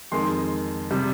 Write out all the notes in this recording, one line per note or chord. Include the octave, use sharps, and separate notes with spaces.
F2 D#3 G#3 C6
C3 G3